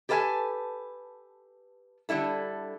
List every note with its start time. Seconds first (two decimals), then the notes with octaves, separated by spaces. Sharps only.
0.09 G4 A4 B4 F5 G#5 A5
2.09 D3 G3 E4 A4